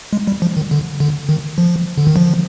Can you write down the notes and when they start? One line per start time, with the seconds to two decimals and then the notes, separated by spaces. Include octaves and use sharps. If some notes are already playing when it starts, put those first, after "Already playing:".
0.13 G#3
0.27 G3
0.42 F3
0.57 D#3
0.71 D3
1.00 D3
1.29 D#3
1.58 F3
1.98 D3
2.07 D#3
2.16 F3